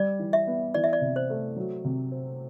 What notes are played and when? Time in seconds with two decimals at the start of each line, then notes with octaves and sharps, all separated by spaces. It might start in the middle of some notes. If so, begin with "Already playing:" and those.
Already playing: G3 D5
0.19 E3
0.33 E5
0.47 B3
0.74 E3 D5
0.84 E5
0.93 D5
1.01 C3
1.16 C5
1.30 A3
1.56 F#3
1.84 C3
2.11 C4